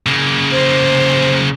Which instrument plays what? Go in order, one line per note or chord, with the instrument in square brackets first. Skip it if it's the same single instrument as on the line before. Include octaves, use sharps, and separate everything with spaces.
[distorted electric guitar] C#3 A#3
[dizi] C5